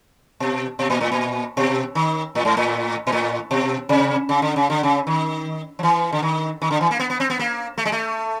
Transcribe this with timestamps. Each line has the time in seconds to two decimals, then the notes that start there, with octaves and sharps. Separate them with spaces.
0.40 B2
0.79 B2
0.90 A#2
1.01 A2
1.12 A#2
1.57 B2
1.95 D#3
2.35 A2
2.45 G#2
2.57 A2
3.07 A#2
3.12 A2
3.51 B2
3.89 C3
4.29 C#3
4.42 D3
4.56 C#3
4.70 D3
4.83 C#3
5.07 D#3
5.79 F3
5.83 E3
6.12 D3
6.22 D#3
6.62 D#3
6.71 D3
6.81 E3
6.91 A#3
6.99 B3
7.10 B3
7.20 C4
7.30 B3
7.39 A#3
7.78 A3
7.85 G#3
7.92 A3